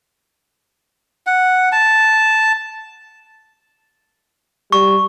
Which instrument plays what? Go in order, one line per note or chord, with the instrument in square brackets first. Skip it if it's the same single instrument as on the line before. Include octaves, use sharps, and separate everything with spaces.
[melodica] F#5
A5
[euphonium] G3 [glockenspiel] C#6